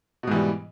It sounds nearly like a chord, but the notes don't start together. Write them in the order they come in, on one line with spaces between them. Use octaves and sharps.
B2 G#2 E3 G3